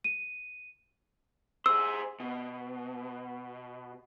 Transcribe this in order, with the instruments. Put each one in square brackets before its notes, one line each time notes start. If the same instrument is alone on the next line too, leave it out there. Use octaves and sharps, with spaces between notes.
[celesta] D#7
[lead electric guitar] G#4 C5 [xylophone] E6
[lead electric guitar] B2